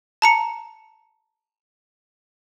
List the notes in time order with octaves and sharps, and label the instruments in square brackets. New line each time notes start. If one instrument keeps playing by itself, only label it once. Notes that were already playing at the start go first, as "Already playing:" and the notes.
[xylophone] A5 A#5 C#7